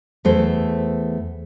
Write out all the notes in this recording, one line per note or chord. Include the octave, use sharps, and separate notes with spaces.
E2 A3 C5